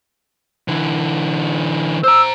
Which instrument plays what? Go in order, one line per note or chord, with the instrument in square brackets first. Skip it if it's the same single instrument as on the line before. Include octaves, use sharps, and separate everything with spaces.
[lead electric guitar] D3 E3
[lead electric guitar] C5 A#5 [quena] E6